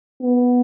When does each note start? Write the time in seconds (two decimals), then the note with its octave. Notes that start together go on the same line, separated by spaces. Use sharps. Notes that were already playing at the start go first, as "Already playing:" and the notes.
0.22 B3